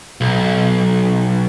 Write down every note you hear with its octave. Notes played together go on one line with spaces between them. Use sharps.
B1